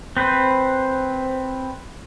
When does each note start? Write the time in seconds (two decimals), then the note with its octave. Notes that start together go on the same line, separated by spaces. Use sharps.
0.17 C4 B4 C5